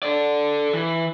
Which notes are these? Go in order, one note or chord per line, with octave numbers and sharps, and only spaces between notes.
A4 D5
E3